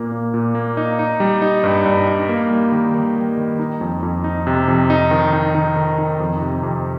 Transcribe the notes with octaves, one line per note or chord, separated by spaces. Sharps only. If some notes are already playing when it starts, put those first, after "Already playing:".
Already playing: A#2 A#3
A#2
A#2
A#3
D#4
D#4
G3
D#4
G2
G2
D#4
A#3
G3
D#3
D#3
G3
D#3
D#4
F2
F2
D#4
C3
F2
D#4
D#3
D#4
D#3
D#3
D#4
F2
C3
F2